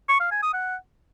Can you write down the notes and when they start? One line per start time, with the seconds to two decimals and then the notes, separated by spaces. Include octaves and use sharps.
0.09 C#6
0.20 F5
0.31 G#5
0.43 D#6
0.54 F#5